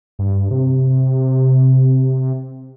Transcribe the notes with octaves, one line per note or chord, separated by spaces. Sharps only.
G2
C3